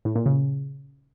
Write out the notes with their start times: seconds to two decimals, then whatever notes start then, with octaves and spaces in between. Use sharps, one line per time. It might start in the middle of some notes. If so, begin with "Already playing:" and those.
0.05 A2
0.16 A#2
0.26 C#3